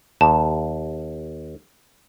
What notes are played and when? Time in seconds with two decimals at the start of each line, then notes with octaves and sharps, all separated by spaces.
0.21 D#2 A5